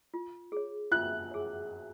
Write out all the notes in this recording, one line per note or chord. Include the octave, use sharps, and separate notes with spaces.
F4
G#4 C#5
F4 F#6
G#4 C#5